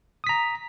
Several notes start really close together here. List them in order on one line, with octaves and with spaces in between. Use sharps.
D#6 B6 A#5